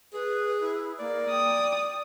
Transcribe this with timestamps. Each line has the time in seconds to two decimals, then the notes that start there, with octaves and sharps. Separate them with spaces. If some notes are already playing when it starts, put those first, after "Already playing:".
0.14 G#4 B4
0.60 E4
0.99 A#3 D5
1.31 G5 D#6